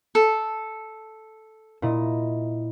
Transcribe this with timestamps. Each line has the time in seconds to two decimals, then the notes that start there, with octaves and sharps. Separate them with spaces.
0.15 A4
1.82 A#2 E4 D#5